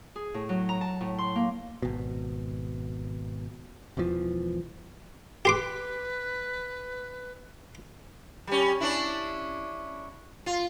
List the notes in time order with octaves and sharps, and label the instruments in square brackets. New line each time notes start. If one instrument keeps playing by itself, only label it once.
[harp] G#4
A2
F#3
A#5
A5
A2
C6
A#3
[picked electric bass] G#1 B2
E1 E2 E3 F3
[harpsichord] G4 C6 D6 [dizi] B4
[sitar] G3 C#4
C#4 D4 E4
F4